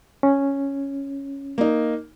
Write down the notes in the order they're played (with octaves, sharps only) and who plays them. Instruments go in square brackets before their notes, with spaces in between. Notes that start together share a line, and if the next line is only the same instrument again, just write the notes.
[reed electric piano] C#4
[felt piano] A#3 D#4